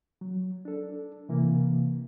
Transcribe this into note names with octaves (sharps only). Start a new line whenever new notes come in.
F#3
D4 A4
C3 E3 A#3